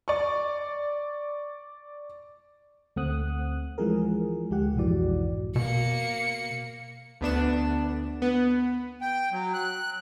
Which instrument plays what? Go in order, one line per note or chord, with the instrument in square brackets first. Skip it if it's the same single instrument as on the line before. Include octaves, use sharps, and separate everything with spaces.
[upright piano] D5 C#6
[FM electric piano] D2 A3 C4 F#5 D#6 F#6
E3 F3 G#3 G#4 A#4
D2 G#3 G4 F#5
B1 F2 G#2 E3 F#4 D5
[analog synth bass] B2 [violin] A#3 C#7
[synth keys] D2 B3 D4 E7
B3
[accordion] G5
F#3
F#6